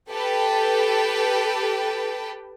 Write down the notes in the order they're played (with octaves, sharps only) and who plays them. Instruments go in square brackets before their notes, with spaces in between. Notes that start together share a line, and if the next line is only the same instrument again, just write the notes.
[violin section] G4 A4 B4 G5 A5